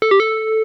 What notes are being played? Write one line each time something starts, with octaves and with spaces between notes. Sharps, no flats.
A4
G4
A4